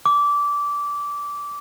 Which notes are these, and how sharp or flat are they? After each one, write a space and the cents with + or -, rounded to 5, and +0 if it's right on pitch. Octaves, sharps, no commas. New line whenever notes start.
D6 -20